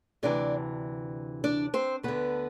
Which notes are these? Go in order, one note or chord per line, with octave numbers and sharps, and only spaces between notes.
D2 C3 E3 D4 D5
D4 D5
C4 C5
D2 D3 B3 B4